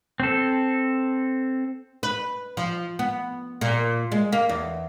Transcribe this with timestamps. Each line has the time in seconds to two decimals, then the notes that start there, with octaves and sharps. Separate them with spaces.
0.20 C4 A4
2.03 B4
2.57 F3
2.99 B3
3.61 A#2
4.12 G#3
4.32 A#3
4.49 E2